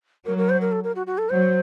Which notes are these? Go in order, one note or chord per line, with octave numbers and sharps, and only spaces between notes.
F#3 A#4
A#4
C5
A#4
A4
A#4
F#4
F#4
A4
F#3 C5